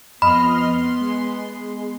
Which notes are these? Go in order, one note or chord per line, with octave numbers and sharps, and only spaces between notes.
F2 B3 D#5 B5 C6 F6
G#3